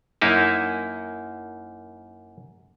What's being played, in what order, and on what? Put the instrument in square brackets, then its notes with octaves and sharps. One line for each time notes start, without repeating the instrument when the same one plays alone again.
[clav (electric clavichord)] F#2 A#3 D#4 E4